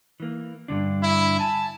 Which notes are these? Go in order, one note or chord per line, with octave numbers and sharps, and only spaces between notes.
E3 A#3
G2 D3 D4
E4
G#5 A5